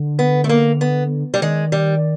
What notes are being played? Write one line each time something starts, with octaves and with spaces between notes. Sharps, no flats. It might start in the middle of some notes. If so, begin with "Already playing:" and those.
Already playing: D3
B3
A3
A#3
B3
G3
D#3 G#3
G3